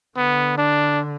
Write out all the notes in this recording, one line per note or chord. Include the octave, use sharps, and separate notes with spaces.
D3 B3
D4